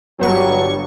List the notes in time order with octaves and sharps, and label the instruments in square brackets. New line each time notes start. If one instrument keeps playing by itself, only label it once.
[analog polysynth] G1 G2 C#6 [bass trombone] F#3